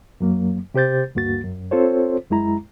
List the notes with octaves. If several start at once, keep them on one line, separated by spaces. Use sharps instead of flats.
F#2 F#3 A#3
C3 G4 C5 G6 A6
D2 G2 A#3 F#4 A6
F#2
C4 F4 A4 C5 C#5
F#2 G#3 E4 A#5